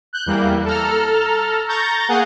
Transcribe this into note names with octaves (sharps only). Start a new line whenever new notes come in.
F#6 G6
E2 E3 G3 A#3
A4 A#5 F6
A#5 C#6 G6 A6 A#6
A#3 G#4 F#5 G#5